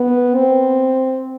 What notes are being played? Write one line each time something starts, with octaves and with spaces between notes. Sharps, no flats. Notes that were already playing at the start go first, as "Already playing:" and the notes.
Already playing: B3
C4